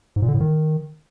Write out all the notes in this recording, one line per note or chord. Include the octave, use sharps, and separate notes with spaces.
G#2
A#2
D3
A2
D#3